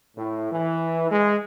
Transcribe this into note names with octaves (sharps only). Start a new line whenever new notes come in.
A2
E3
G#3